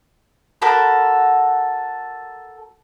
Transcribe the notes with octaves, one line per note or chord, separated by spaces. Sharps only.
F#4 A4 A#4 B5